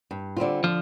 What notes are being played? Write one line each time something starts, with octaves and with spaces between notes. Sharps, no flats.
G2
D3 G3 C4 F4
D3 F3